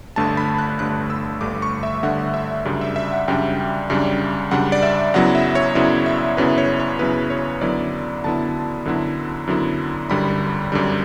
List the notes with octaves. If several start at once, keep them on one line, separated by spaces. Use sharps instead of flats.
G1 G2 D3 A3 A5
B5
F#6
G1 G2 D3 A3 F#6
E6
G1 G2 D3 A3 D6
C#6
E5
G1 G2 D3 A3 F#5
E5
F#2 C#3 G3 D4 D5
E5
E5
F#5
F#2 C#3 G3 D4 G5
F#2 C#3 G3 D4
F#2 C#3 G3 D4 F#5
D5
E5
F#2 C#3 F#3 B3 E4 F#5
E5
C#5
F#2 C#3 F#3 B3 E4 D5
E5
F#2 C#3 F#3 B3 E4 B4
C#5
C#5
F#2 C#3 F#3 B3 E4 B4
C#5
F#2 D3 F#3 B3 E4 D5
F#2 D3 F#3 B3 E4 A5
F#2 D3 F#3 B3 E4
F#2 D3 F#3 B3 E4
G1 F#2 D3 G3 B5
G1 F#2 D3 G3